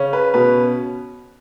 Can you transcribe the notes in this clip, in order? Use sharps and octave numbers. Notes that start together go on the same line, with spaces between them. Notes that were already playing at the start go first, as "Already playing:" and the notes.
Already playing: C#3 C#4
B4
B2 B4